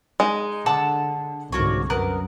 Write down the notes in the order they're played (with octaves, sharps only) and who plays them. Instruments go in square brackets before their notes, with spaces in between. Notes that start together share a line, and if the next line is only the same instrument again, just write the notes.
[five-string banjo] G#3 [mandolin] D#4
[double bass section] D3 [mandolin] F#5 A5 E6
[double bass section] C2 G#2 D3 [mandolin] A#3 F#4 C#5
[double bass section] F#2 [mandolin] B3 A#4 F#6